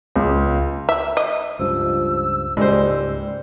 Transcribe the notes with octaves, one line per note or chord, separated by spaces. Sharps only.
C#2
E5
D#5
C#2 G2 F3 E6
C#2 G#2 G3 C5